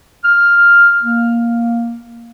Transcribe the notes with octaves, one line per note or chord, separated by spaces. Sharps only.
F6
A#3